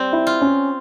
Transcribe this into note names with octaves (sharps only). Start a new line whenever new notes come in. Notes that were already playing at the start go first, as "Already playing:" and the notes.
Already playing: G3 C4
E4
F4
C#4